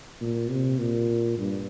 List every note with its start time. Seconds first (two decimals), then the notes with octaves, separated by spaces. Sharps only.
0.21 A#2
0.49 C3
0.79 A#2
1.38 G2